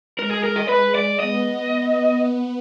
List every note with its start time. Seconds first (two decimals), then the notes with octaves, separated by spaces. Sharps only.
0.18 G#3 A#4
0.31 G#4
0.44 A#4
0.56 D#5
0.69 G#3 B4
0.95 D5
1.20 B3 D#5